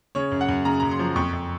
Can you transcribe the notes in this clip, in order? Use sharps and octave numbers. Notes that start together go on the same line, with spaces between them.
C#3 C#5
F#2
F#5
F#2
C#3 A#5
F#2 A#5
C6
F3
F2 C#6
F2